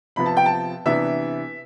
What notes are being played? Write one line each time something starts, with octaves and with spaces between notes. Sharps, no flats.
C3 F3 B3 B5
A5
G5
A5
C3 E3 B3 D4 E5